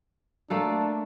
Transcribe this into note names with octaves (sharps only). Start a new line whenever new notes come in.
A3 A#3 D4 A4